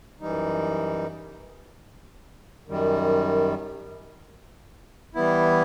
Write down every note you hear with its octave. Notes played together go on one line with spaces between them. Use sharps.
F#2 E3 G3 D#4
F#2 D#3 G3
E3 G3 B3 E4